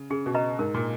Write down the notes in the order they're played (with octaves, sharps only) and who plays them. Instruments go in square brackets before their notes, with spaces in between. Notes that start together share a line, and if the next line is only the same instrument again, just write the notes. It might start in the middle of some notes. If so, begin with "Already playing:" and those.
Already playing: [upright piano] C#3
[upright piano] C#3 [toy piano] G#4
[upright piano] B2
[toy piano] B4 D#5 A#5
[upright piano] G#2 [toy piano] A#4
[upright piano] A#2